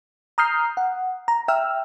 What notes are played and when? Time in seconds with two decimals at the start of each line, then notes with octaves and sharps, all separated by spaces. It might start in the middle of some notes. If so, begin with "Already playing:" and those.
0.38 A#5 D#6 F6 G6 C7
0.77 F#5
1.28 A#5
1.48 E5 G5 E6 F6